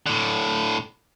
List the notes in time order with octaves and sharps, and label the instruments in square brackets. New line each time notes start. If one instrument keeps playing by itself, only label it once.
[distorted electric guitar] A2 D3